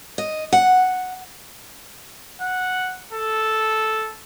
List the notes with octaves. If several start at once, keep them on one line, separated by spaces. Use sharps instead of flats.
D#5
F#5
F#5
A4